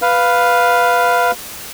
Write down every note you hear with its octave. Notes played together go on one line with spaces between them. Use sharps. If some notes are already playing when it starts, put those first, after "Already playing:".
B4 F5